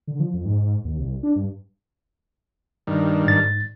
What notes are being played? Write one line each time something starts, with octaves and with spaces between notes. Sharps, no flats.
D3
F3
F2
G#2
G#2
D#2
C2
D4
G2
G2 D#3
G#2 A6